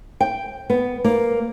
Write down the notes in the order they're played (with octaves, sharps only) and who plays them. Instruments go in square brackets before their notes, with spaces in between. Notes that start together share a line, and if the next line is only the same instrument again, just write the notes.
[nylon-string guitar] G5
B3
A#3